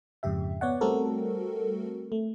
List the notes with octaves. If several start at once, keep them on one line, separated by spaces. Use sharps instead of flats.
F2 G#2 C#3 G4 E5
B3 C#5 D5 F#5
G3 A3 C4 F#4 A4 A#4
A3